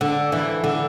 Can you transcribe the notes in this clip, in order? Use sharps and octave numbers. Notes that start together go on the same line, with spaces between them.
D3
E3
D3